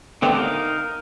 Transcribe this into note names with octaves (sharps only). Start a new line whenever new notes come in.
D3 A3 B3 C4 G4
D#4 A#4 F5